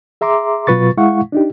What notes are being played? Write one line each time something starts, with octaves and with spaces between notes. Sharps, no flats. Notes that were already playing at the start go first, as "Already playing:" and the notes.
G#4 E5 A#5 C6 D6
B2 F#3 F4 B4 C#6 A6
G#3 E4 F5 F#5 C#6
D4 D#4 G4